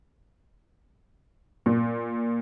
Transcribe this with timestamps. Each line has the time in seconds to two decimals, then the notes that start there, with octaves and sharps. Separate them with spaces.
1.66 A#2